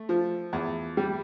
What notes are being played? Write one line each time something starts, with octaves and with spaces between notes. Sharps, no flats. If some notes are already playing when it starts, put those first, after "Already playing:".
Already playing: A3
F3
E2
G3